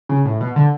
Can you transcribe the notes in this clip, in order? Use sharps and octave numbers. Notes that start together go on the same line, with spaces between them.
C#3
A2
B2
D3